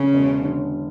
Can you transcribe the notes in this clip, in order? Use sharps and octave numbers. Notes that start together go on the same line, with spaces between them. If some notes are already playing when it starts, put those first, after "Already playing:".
Already playing: C#3 C#4
E1
D3